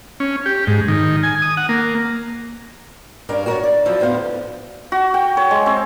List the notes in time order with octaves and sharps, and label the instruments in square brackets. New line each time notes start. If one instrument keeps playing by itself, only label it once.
[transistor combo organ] C#4
G4
G#2
D#3
G#5
D#6
F#5
A#3
[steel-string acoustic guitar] G2 C#4 A#4 D5 F5
F#4 G#4 A#4 B4 C#5 D5
D5
F2 F3 F#3 E4
D2 A2 B3 C5 C#5 F5
[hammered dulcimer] F#4
G5
C#5
G#3
C4